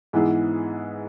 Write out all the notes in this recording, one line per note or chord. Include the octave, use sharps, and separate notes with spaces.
G#2 E3 B3 E4 G#4